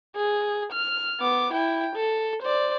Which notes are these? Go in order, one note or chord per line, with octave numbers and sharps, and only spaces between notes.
G#4
F6
B3 D6
E4 G5
A4
C5 D5